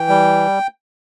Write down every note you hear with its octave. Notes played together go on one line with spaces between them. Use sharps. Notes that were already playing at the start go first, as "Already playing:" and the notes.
Already playing: E3 G5
G3